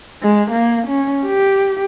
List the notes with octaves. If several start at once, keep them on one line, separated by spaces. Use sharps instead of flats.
G#3
A#3
C#4
G4